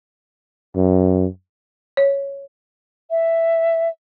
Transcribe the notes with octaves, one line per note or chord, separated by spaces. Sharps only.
F#2
C#5
E5